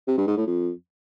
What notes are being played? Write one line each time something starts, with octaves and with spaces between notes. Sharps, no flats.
C3
G2
G#2
A2
F2